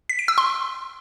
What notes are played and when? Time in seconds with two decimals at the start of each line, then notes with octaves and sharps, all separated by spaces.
0.09 B6
0.19 D7
0.28 E6
0.38 C6